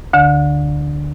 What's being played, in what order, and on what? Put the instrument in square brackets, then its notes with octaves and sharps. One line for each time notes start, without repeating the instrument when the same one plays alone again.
[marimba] D2 D3